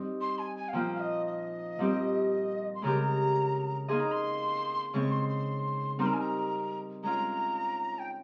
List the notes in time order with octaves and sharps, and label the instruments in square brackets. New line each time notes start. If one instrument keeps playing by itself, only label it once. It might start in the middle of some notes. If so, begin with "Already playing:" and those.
Already playing: [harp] G3 C4 D#4
[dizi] C6
G#5
G#5
F5
[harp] A#2 F3 A#3 F4 [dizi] G5
[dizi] F5
D#5
D#5
[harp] A#2 G3 C4 G4
[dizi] C6
[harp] C#3 G#3 C#4 G4 A#4 [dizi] A#5
[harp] A#3 D#4 G#4 D#5 [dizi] C6
[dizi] A#5
C6
[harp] C#3 G#3 C4 [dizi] C#6
[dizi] C6
C6
[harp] G3 C4 D#4 A#4 [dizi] C6
[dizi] A#5
G#5
A#5
[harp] G#3 C#4 F4 [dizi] A#5
[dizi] G5